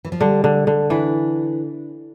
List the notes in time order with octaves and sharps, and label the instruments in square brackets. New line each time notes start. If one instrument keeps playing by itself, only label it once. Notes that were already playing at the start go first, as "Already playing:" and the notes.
[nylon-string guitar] E3
F3
[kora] D3 [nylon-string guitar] G3
[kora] D3
D3
[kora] E3 [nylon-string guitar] D4